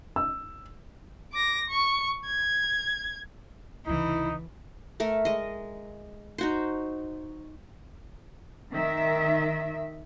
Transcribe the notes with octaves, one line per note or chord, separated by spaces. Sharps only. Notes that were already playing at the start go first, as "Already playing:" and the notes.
E6
D6 A#6
C#6
G#6
C#2 C3 E3 D#4 E4
A3 A#4 E5
G#3 D#5
D#4 F#4 C5
D#3 E5